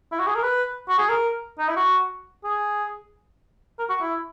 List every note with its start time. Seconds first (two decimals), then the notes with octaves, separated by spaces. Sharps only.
0.12 E4
0.19 F#4
0.27 G#4
0.35 A#4
0.43 B4
0.89 F#4
0.98 G#4
1.09 A#4
1.59 D#4
1.68 E4
1.77 F#4
2.44 G#4
3.79 A#4
3.89 F#4
4.01 E4